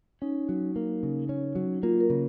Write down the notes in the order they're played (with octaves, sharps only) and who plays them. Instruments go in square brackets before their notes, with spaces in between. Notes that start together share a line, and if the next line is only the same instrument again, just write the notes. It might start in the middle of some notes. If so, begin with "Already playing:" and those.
[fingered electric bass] C#4 [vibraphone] D#4
[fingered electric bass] F#3
A#3
C#3
C#4
F#3
[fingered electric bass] A#3 [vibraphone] F4
[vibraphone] A#4
[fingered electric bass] C#3